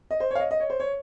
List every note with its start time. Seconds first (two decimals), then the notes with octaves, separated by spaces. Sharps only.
0.11 D#5
0.20 C5
0.31 C#5 F5
0.40 D#5
0.51 D#5
0.60 C#5
0.70 C5
0.80 C#5